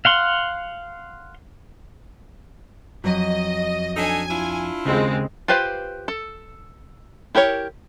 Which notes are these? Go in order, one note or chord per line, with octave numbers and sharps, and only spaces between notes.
F5 F#5 C6
F2 F#3 D#5
D4 D#4 A4 G#5
D4 E4 F4
D#2 C#3 G#3 C4
F4 G4 B4 C5 F5
A4
E4 G4 A#4 C#5